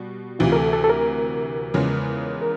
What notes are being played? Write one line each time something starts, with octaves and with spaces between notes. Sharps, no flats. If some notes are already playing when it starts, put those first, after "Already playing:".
Already playing: B2 G3 F#4
D2 C3 E3 F4
A#4
A4
A4
A4
A#4
E2 C#3 F3 G#3 B3
A#4